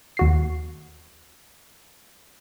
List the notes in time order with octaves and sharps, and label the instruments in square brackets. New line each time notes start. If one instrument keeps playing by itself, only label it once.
[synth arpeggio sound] D#2 F#4 C7